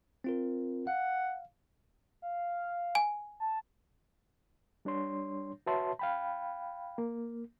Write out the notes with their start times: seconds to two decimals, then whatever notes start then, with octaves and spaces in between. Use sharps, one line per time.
0.24 C4 F4 A#4
0.87 F5 F#5
2.22 F5
2.95 G#5
3.40 A5
4.85 G3 D4 C#5 C6
5.66 F#4 B4 C#5 E5 A5 C6
5.99 F5 G5 B5
6.98 A#3